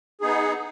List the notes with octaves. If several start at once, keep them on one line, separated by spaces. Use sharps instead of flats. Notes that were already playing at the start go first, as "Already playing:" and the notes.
B3 D#4 G#4